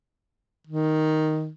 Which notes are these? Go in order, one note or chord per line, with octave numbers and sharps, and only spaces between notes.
D#3